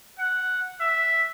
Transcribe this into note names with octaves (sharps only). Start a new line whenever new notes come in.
F#5
E5